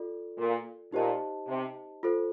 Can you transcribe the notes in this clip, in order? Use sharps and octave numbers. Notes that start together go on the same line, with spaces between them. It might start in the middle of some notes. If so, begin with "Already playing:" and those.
Already playing: F4 A4 D5
A#2
A#2 D#4 G4 C5 D#5 A5
C3
F4 A4 C5